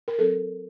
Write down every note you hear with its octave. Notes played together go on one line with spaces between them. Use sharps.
A#4
F#3 C4 A4